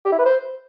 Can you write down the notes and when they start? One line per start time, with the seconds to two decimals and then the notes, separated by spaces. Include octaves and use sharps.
0.05 G4
0.12 E4
0.19 B4
0.25 C5